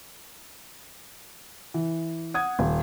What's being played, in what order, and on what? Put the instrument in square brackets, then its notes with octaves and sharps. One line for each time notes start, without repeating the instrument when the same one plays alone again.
[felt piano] E3
F#5 D#6 G#6
D#1